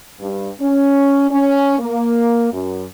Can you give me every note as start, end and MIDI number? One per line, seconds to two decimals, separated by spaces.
0.20 0.49 43
0.60 1.26 61
1.30 1.79 61
1.79 2.48 58
2.52 2.84 42